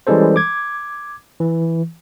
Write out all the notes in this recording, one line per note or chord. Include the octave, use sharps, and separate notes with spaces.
E3 G3 G#3 C#4 A4 C5
D6 G#6
E3